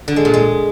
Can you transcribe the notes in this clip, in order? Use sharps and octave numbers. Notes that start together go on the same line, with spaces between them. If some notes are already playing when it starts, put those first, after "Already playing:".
D3
G#3
A#2
G#3